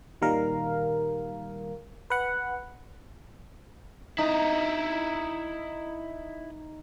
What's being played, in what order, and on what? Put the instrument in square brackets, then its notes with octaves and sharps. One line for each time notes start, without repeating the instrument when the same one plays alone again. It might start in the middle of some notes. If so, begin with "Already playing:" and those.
[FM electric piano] A#2 D#3 G3 A#4 F5
B4 F#5
[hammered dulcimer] D#4 [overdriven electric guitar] E4 D#5